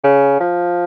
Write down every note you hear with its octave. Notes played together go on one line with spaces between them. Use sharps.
C#3
F3